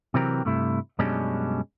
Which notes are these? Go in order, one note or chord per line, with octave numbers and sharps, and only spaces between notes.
C3 E3 F#3 C4 G4 A#4
G2 C3 A3 E4
F#2 B2 G3 G#3 C#4 D4